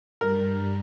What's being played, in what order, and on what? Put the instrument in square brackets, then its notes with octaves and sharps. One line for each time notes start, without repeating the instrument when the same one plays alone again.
[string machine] G2 G3 [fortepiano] A#4